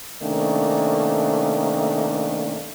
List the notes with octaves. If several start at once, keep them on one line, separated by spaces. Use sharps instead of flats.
C3 D#3 A3 A#3 C#4 D4